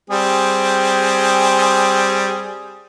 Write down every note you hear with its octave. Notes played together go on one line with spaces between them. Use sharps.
G3 C4 G#4